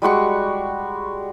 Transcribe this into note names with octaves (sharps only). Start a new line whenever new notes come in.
G3 G#3 F#4 C#6